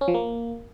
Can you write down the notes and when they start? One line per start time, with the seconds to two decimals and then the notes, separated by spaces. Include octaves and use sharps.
0.01 C#4
0.08 F3
0.14 A#3